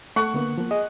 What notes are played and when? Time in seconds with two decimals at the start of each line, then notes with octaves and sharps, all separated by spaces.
0.16 A3 F#5 C#6
0.34 D3 A#3 B3
0.58 F3 A#3
0.71 G#4 D#5